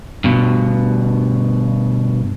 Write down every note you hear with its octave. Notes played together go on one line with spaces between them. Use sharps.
G2 B2